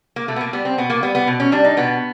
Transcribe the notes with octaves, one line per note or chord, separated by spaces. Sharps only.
A#3
B2 A3
B3
A#3
G3 B3
C4
B2 B3
A#3
G3 B3
B3
B2
C#4
G3 D4
D#4
B2 B3